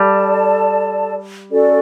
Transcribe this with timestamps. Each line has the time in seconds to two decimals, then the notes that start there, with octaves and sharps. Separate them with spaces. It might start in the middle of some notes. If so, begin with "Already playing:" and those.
Already playing: G3 A4 D5 A5
1.50 C#4 F#4 A4 D5